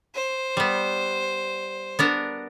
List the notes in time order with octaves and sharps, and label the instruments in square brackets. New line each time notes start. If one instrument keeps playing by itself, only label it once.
[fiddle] C5
[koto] G3 B3
B3 D4 A#4